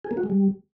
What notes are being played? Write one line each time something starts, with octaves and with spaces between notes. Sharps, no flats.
G#4
A#3
F#4
G#3
G3